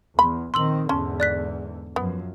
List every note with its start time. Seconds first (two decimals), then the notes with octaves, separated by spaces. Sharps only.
0.19 E2 B5 C6
0.54 A#1 D#3 C4 C6 E6 F#7
0.89 E2 G#2 D3 C#4 A5 C6
1.20 D5 F#6 B6
1.96 F#2 F3 B3